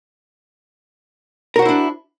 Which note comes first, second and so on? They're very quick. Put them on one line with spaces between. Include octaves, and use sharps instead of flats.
A#4 F#4 C5 E4 D4